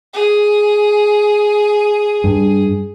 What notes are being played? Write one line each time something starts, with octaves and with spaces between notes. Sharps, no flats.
G#4
G2